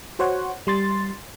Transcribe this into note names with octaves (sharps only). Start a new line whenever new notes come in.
F#4 C5 C#5 F#5
G3 C6 A6